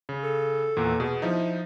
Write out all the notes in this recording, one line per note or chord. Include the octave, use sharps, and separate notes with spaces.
C#3
A4
E2 A#2
B2 G#4
F3 D#4 E4